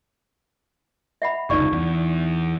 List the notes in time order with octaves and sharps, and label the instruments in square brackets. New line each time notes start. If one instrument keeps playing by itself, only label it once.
[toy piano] E5 F#5 B5
[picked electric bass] F1 C#2 [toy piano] D#4 D5 C#6
[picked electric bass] E2